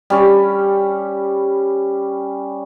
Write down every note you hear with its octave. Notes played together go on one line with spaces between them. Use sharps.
G3 C#4